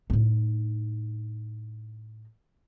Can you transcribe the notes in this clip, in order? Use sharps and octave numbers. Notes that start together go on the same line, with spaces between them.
A2 D#4